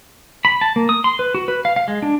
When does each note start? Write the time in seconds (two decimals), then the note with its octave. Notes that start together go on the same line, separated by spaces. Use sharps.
0.45 B5
0.61 A5
0.76 A#3
0.89 D#6
1.04 C6
1.19 B4
1.35 F#4
1.48 B4
1.65 F5
1.76 F5
1.88 G#3
2.02 D4